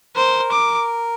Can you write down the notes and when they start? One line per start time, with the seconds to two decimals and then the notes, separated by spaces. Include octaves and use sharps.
0.16 A#4 C5
0.52 D6